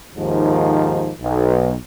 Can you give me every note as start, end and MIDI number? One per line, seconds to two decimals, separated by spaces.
0.17 1.12 39
0.17 1.12 44
0.17 1.12 51
0.17 1.12 53
1.21 1.74 35